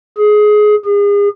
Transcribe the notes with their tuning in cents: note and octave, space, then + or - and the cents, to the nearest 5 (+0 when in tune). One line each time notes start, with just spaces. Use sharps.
G#4 +20
G#4 -35